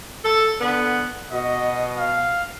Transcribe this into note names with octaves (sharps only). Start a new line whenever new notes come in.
A4
D3 B3
B2 D#5
F5